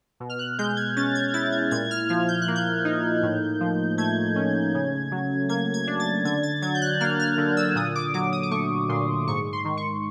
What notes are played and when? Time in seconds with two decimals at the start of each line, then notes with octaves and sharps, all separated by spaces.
0.20 B2
0.29 F6
0.39 F#6
0.59 G#3 G6
0.77 G#6
0.96 C#4 A6
1.15 G#6
1.34 E4 A6
1.52 G#6
1.71 A#2 G#6
1.91 F6
2.09 F3 F6
2.28 G6
2.41 F#6
2.48 A#3
2.56 G6
2.85 D#4
3.23 A2
3.60 F3
3.98 A3 G#6
4.36 C#4
4.74 C#3
5.11 F#3
5.49 A#3 G#6
5.74 G#6
5.87 D4
6.00 A6
6.25 D3 G#6
6.43 A6
6.62 F#3 G#6
6.75 G6
6.81 F#6
7.00 A#3 F6
7.19 F6
7.38 D3
7.57 E6
7.75 A#2 D#6
7.95 D6
8.14 F#3 D6
8.32 D#6
8.43 D6
8.51 A3 C#6
8.89 A#2 C6
9.27 G#2 C#6
9.53 C6
9.64 D#3
9.77 C#6